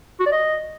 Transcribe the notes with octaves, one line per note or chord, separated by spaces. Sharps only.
F#4
D5
D#5